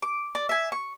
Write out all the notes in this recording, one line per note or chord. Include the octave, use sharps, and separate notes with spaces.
D6
D5
E5 G#5
C#6